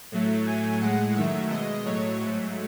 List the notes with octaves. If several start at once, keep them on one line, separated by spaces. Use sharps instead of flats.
A2 F#3 A3
A2 F#3 A3 G#5
A2 G#3 F#5
F#2 D#3 F#3 A3 E5
B2 G#3 D#5
A2 F#3 A3 C#5
G#2 F#3 A3